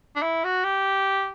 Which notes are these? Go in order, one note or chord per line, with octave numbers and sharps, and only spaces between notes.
D4
E4
F#4
G4